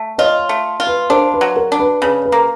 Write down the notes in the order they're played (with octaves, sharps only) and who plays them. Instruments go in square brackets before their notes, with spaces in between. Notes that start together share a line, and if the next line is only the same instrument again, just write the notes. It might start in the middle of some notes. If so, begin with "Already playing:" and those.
Already playing: [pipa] A3
[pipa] F4 [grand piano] C#5 D#5
[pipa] A3
F4
[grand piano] B4
[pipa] D4 [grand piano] A#4 C5
[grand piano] B4
[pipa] F#3
[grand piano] A#4
[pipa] D4
[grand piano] B4
[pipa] C#3 [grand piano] B4
[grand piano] B4
[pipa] A#3